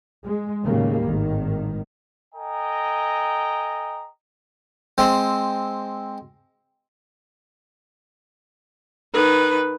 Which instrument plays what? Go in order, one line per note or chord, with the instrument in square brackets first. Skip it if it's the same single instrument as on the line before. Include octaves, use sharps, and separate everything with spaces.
[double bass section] G#3
D#2 A2 C#3 G3 A#3
G#1 A2 D#3
[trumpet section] A4 D#5 G5 G#5 A#5
[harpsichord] G#3 C4
[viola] D#3 B4